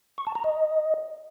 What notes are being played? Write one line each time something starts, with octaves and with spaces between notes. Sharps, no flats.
C#6
A5
A#5
D#5